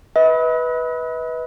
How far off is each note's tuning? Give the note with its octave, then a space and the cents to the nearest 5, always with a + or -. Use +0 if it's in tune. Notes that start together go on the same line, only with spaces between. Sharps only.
B4 -5 D#5 +45